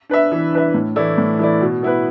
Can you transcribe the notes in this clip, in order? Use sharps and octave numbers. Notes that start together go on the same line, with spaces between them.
D4 B4 E5
E3
D4 B4 E5
A2
E3 A3 E4 D5
A2
E3 A3 E4 D5
B2
B3 E4 B4